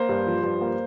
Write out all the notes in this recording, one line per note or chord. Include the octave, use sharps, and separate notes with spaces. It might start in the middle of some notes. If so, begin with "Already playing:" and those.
Already playing: A#3 C5
G2
F3
G2
A#3